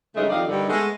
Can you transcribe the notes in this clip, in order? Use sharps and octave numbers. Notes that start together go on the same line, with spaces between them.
G2 C#3 F#3 G#3 A3 D#4
F2 D#3 G4 D5 D#5 F5
G2 D3 D#3
G#3 A3 B3